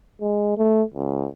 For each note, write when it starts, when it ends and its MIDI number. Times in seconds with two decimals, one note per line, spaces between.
0.21 0.57 56
0.58 0.83 57
0.94 1.28 37